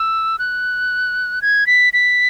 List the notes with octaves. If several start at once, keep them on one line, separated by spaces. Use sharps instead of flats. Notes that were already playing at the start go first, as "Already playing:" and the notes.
Already playing: E6
F#6
G#6
B6
B6